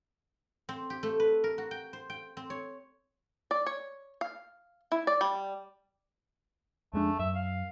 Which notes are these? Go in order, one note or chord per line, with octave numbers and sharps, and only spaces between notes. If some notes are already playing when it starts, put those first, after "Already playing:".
C4
G4
A3
B4
A#4
F#4
G5
C5
G5
C4
C#5
D5
C#5
F5
E4
D5
G3
F2 G#3 A3 D4
F#2 E5
F5